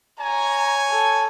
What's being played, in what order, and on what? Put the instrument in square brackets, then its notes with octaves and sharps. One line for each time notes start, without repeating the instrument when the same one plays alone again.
[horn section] C#5 G#5 [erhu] A#5
[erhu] A4